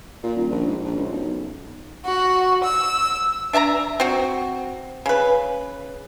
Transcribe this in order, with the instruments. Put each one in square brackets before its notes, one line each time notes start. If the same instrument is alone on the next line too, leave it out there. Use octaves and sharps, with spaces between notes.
[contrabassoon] A#2
D#1
A#1
G#2
A#1
C#2
B1
[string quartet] F#4
E6
[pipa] D4 E5 A5 A#5
C4 F#4
C#3 B4